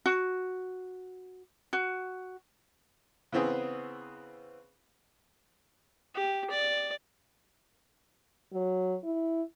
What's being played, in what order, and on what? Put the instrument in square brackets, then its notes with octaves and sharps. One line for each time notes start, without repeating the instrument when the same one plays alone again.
[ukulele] F#4
F#4
[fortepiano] C#3 E3 B3 C4 G#4
[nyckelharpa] G4
D5
[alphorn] F#3
E4